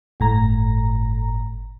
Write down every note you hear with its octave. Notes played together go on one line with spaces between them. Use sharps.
G1 A2 A#5